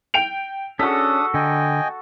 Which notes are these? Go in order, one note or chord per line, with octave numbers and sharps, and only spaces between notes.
G5 D7 F7
C#4 D4 F#4 A4 D#6 B6
D3 D#5 G5 G#5